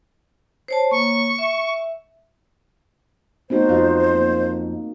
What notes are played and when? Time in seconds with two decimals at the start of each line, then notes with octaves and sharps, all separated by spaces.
0.68 C5 C#5 A5
0.91 A#3 C#5 C#6
1.39 E5
3.50 A3 B3 C4 D#4 F#4 C5
3.69 F2 A3 F4 F#4 D#5 G6
4.14 A#3